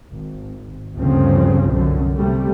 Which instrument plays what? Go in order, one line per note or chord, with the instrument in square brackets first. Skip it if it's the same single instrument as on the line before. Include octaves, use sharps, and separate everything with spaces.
[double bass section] G#1
G1 D2 G2 C#3 F3 C4
C2 F#2 D3
C3 G3 A3